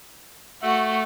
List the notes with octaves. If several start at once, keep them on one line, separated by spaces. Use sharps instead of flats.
A3 F#4 A4